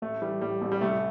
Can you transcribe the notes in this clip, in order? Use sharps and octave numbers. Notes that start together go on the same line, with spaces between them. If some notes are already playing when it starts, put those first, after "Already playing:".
A1 A3
E3 G3
A2 G3
A1
G3
C2 A3